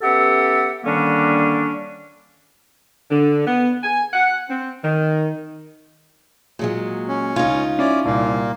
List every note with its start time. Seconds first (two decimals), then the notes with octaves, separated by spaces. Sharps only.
0.01 B3 C#4 G4 A4 E5 F#5
0.84 D3 D#3 G3 A#3 C#4 D4
3.11 D3
3.46 B3
3.83 G#5
4.13 F#5
4.48 C4
4.83 D#3
6.59 A#2 F#3 G#3 G#4
7.08 C#4
7.36 C#2 D#4 F4 G#6
7.79 C#4 E4 D5
8.05 C2 A#2 A#3